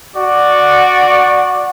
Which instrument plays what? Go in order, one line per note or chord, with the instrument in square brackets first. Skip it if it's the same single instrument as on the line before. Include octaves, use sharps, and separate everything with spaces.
[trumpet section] F#4 D5